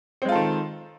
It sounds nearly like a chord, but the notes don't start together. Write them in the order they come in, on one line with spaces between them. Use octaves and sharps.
C4 G#3 F4 A4 D#3